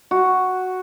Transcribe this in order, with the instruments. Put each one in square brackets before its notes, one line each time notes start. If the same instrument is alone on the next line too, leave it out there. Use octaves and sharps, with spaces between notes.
[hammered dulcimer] F#4